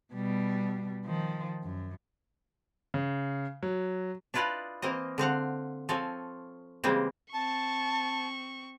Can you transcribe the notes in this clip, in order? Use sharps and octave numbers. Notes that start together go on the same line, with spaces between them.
B2 G3
D#3 F3
F#2
C#3
F#3
D4 E4 F4 B4 D5 D#5
E3 A#3 C4 A#4 C5 D#5
D3 C4 F5 F#5
F3 C4 A4 C#5 G#5
C#3 E3 G3 G#3 A#3 C4
C4 A5 C#6